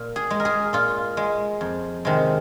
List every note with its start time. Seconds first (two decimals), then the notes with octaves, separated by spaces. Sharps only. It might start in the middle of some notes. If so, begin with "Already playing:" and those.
Already playing: A#2
0.16 G#4
0.30 G#3
0.40 A#4
0.45 G#4
0.73 A#2 F4
1.17 G#3
1.61 F2
2.05 C3 D#3 G#3